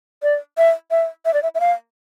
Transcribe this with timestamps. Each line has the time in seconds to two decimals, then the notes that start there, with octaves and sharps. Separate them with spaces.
0.23 D5
0.58 E5
0.91 E5
1.25 E5
1.34 D5
1.43 E5
1.55 E5
1.60 F5